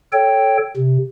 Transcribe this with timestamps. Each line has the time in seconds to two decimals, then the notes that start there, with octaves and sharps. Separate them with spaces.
0.13 A4 C#5 G5
0.77 C3